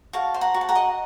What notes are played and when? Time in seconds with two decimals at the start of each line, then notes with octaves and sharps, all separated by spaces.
0.13 F#4 F5 A5
0.34 C5
0.41 F#5 A#5
0.54 F#4
0.61 A5
0.69 F#5 A#5
0.75 D#5